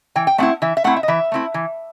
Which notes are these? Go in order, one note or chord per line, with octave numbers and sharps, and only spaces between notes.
E3 G5
G5
A3 C4 E4 F#5
E3 E5
E5
A3 C4 E4 F#5
E5
D#5
E3 E5
A3 C4 E4
E3